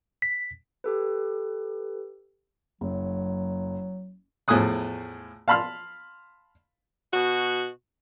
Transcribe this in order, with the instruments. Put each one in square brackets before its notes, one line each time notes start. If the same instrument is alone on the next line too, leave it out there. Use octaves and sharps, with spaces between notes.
[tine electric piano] B6
[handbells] G4 A4 B4
[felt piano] F#1 [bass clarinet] F#3
[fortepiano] E2 A2 F3 G#5 D#6 F#6
F5 A5 B5 C6 F6
[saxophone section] B2 F#4